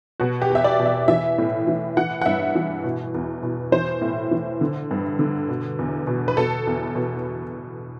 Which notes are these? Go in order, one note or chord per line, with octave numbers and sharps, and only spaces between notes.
B2 F#4
G4
E2
E5
D5
B2
E5
E3 E5
A2
E3
E3 F#5
F#5
G2 E5
E3
B2
E2
B2
E3 C5
A2
E3
D3
G2
D3
B2
E2
B2
B4
B2 A4
E2
B2